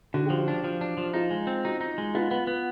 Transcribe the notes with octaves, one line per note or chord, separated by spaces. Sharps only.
D3 F#4
F3 G4
F#4
D4
F3
D4
F3
D#4 F4
G#3
C4
D#4 F#4
D#4
G#3
B3 F4
B3
B3